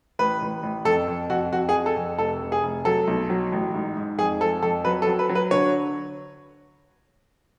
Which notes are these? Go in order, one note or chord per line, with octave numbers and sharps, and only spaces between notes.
A1 B4
A1
A1
F2 A4
F2
F2 F#4
F2 F#4
G#4
F2
A4
F2
F1 A4
F1
G#4
F1
F#3 A4
B1
F#3
A1
G#2
G#2
F2 G#4
F3 A4
F2 A4
F#3 B4
A4
F#3
B4
F#3
B4
D3 C#5